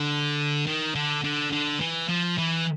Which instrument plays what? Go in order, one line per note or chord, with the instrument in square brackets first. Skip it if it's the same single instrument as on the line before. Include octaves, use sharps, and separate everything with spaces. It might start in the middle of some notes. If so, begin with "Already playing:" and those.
Already playing: [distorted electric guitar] D3
D#3
D3
D3
D3
E3
F3
E3